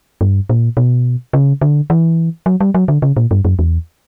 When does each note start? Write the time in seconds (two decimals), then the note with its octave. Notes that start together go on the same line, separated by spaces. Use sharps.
0.21 G2
0.50 A#2
0.77 B2
1.33 C#3
1.61 D3
1.90 E3
2.46 F#3
2.61 G3
2.74 F#3
2.88 D3
3.02 C#3
3.17 A#2
3.31 G2
3.45 F#2
3.59 E2